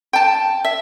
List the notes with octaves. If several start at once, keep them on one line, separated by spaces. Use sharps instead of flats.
G5 A5
E5